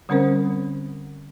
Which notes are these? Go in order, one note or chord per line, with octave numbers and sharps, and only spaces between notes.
D3 G3 C4 C#4 A#4 C5